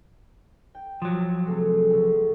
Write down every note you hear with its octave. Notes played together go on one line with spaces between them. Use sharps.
G5
F3 F#3 A5 D6
C3 G#3 A3
C#2